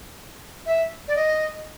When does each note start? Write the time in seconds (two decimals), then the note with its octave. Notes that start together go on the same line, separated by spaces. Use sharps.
0.66 E5
1.08 D5
1.16 D#5